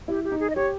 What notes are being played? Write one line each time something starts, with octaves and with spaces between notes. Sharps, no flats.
E4 G4
G4
D#4
G#4
D#5
G4 C#5